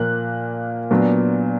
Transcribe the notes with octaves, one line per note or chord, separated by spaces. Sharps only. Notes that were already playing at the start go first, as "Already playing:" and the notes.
Already playing: A#2 F3 A#3 F#6
A#2 F#3 B3 D4